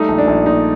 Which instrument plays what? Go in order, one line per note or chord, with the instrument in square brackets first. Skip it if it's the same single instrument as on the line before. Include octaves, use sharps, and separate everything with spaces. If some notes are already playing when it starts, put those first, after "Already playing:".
Already playing: [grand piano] G3 A3 D#4
A#1
D4
A#1
A#2 D#4